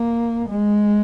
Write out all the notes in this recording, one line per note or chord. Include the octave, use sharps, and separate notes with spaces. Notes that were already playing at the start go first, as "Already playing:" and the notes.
Already playing: A#3
G#3